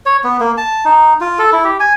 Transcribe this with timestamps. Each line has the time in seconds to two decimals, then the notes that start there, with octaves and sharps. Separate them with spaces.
0.06 C#5
0.24 B3
0.40 A#3
0.57 A5
0.85 D#4
1.21 F4
1.39 A4
1.52 E4
1.64 G4
1.80 G#5